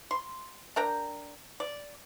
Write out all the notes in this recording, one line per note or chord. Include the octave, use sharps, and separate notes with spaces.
C6
D4 A#4 G5 A#5
D5